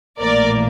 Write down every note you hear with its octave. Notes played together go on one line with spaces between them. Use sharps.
A#1 A2 E3 A#3 A#4 D5